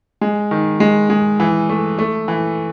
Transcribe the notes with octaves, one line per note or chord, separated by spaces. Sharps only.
G#3
D#3
G#3
G#3
E3
A3
A3
E3